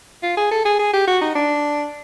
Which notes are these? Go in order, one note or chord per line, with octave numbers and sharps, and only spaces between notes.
F4
G#4
A4
G#4
G#4
G4
F#4
D#4
D4